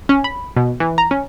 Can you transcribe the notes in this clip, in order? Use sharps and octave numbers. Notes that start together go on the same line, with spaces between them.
C#4
B5
B2
E3
A#5
C#4